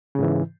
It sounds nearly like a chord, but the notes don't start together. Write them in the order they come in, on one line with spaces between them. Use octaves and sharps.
C#3 G#2 E3